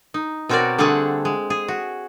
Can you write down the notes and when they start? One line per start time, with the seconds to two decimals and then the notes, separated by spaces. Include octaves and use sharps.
0.14 D#4
0.49 B2 C4 F#4 A#4 C#5 D5
0.78 D3 G3 A3 C4 G#4 F#5
1.25 G#3
1.50 G#4
1.68 F#4